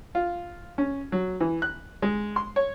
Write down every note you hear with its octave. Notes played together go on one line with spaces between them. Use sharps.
F4
C#4
F#3
E3
F#6
G#3
C6
C#5